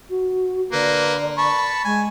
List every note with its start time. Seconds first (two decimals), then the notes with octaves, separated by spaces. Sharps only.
0.10 F#4
0.72 D3 A#3 B4
1.38 A5 B5 C#6
1.85 G#3 G#5